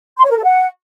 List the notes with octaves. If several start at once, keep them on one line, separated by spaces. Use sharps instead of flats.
C6
C#5
A#4
A4
F#5